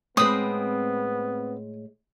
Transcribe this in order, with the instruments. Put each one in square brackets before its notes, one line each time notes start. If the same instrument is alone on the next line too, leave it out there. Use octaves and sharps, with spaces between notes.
[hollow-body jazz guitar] A2 G#3 [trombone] B3 [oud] C4 B4 [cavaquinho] D#6